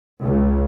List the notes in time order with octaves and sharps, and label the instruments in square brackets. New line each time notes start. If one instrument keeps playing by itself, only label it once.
[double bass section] C#2